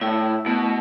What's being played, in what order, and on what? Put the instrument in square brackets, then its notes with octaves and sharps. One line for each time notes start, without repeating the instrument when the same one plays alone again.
[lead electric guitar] A2 [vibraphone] E4
[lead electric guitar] B2 [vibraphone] A3